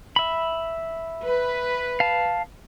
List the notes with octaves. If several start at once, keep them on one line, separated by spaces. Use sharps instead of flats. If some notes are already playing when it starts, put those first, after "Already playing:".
E5 B5
B4
F5 A5